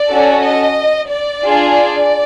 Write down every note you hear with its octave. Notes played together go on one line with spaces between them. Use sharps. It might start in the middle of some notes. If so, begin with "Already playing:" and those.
Already playing: D5
C#4 F#4 A4
D#5
D5
D4 F4 G#4
D5